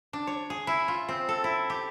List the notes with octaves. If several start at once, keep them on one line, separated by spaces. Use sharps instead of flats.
D4
C#5
G#4
E4
F4
C4
A4
E4
G4